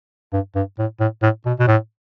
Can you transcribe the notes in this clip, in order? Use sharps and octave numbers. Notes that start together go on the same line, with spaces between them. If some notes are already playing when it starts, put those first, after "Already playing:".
G2
G2
A2
A2
A2
B2
B2
A2